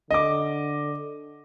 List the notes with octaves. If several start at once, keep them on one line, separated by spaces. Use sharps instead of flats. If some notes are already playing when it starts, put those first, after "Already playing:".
D3 D#5 D6